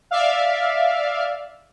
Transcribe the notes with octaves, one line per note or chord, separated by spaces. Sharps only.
D5 E5 F5